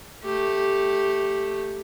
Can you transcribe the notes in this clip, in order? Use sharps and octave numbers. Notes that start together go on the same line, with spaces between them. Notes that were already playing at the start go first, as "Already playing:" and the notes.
A3 G4